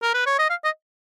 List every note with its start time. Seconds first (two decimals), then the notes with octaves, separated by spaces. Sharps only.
0.02 A#4
0.14 B4
0.26 C#5
0.39 D#5
0.50 F5
0.65 D#5